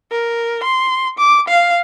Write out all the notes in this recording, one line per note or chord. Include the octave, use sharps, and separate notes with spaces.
A#4
C6
D6
F5